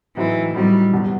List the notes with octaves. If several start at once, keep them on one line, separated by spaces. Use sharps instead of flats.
A2 E3 F#3 C4 D#4
A2 F#3 G3 C4 D#4
F#1 E2 B2 G3 B3